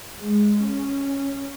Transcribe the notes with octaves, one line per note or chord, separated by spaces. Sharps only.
G#3
C#4